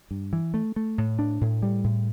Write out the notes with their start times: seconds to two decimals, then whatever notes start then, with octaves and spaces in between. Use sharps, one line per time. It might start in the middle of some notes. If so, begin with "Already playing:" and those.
0.11 G2
0.33 E3
0.54 A3
0.76 A3
0.98 A2
1.19 D4
1.41 A2
1.63 G3
1.84 A2